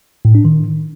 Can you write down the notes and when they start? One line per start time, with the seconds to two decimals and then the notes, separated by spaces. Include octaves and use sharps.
0.25 A2
0.35 D4
0.45 D#3